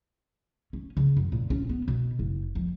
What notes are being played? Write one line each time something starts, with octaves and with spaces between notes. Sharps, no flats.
C#4
C#3
F#2
A#2
C#4
B3
B2
F#1
F2